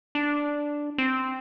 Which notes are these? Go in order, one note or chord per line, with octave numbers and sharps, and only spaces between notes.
D4
C4